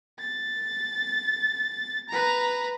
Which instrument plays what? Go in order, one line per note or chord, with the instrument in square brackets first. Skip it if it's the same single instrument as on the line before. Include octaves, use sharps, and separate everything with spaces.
[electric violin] A6
B4 A#5